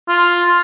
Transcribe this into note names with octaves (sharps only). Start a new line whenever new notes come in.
F4